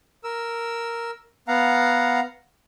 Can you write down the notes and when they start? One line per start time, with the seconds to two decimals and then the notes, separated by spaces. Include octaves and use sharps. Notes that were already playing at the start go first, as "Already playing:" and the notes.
0.24 A#4 E6
1.48 B3 F5 F#5 A#5